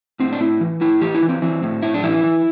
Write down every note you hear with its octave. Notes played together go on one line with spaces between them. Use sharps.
A2 C4
D4
A2 E4
E3
A2 E4
E3 G4
E4
E3
C4
E3 C4
A2
A2 E4
D4
E3 E4
E3